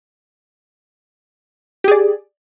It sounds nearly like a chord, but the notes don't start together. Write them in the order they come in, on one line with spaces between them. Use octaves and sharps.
G4 G#4 D5